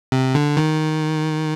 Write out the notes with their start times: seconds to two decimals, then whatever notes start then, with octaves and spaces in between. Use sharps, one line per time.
0.12 C3
0.35 D3
0.57 D#3